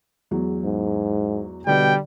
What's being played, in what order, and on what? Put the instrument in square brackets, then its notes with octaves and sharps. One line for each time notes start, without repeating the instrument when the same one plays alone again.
[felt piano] E2 F#3 G#3
[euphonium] G#2
[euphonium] B2 [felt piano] D3 [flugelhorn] G3 [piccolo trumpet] G5